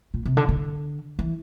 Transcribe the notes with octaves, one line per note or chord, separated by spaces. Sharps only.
A#2
C3
D3
D3
E3